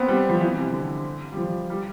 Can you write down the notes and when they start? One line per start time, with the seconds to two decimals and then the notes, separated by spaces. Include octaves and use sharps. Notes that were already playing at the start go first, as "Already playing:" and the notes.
Already playing: B3 C4
0.08 G3
0.29 F3
0.41 E3
0.57 C3
0.73 D3
1.32 G3
1.37 F3
1.70 G3